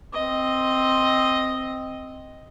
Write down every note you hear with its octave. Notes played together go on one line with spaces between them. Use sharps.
C4 D#5